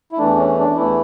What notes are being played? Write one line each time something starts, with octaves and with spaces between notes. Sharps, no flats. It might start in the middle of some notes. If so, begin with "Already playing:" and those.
E4
E2 E3 A3 D4
C#4
D4
E2 E3 A3 E4